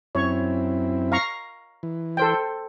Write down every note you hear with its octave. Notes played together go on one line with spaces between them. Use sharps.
F#2 C4 E4 C#5 C#6
F5 A#5 C#6
E3
A4 C5 G5